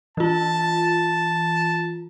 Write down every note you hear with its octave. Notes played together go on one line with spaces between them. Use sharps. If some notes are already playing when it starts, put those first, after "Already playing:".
E3 F4 A5